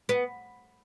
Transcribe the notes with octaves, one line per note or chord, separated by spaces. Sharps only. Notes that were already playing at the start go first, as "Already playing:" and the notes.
B3